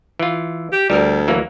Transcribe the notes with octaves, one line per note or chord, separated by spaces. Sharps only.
E3 F4
G4
D2 G3 A#4
E3 F#3 A#3